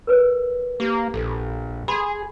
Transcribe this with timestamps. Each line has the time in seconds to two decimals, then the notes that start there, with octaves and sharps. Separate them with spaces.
0.07 A#4 B4 C#5
0.80 A#3 G4
1.14 A#1 A4
1.88 G#4 B5 C6